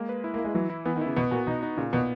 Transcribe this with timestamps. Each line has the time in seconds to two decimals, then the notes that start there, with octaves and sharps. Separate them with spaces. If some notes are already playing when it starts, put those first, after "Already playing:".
Already playing: G#3 A#3
0.09 B4
0.24 E4
0.34 A#3
0.39 E4
0.44 G#3
0.55 E3 F#3
0.70 E4
0.85 E3 B3
0.96 D#3
1.01 C#3 E4
1.16 B2 B3
1.31 A#2 F#4
1.47 B2 D#4
1.63 D#4
1.77 A#2 C#3
1.93 B2 B3